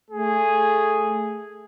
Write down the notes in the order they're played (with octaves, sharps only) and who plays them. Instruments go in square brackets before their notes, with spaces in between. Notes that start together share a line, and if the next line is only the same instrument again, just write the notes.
[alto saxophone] A3 [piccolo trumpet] G#4